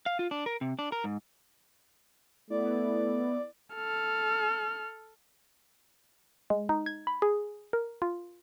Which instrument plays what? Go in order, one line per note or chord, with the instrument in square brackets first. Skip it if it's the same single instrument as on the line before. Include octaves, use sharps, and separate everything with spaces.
[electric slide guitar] F5
F4
D4
A#4
C3
D4
A#4
G#2
[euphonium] A3 [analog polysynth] B3 E4 [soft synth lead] D5
[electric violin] A4 F6
[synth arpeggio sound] G#3
D#4
G#6
B5
G#4
A#4
F4